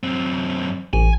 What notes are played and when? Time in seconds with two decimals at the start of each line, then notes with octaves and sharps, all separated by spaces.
0.03 F#2 C4
0.93 A1 G#5